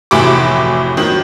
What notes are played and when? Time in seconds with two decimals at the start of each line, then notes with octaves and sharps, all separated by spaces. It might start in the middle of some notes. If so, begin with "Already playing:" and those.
0.11 F1 A2 E3 F#4 G4 D6
0.97 D#3 F#3